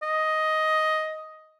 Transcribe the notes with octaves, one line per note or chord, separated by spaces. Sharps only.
D#5